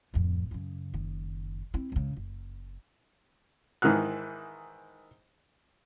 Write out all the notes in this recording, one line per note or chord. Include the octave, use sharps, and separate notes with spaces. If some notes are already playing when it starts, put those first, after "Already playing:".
D1 F2
F#2 C#3
F#1 D#3
C4 E4
C#2 C#3
F#1
G#2 D#3 E3 F6 F#6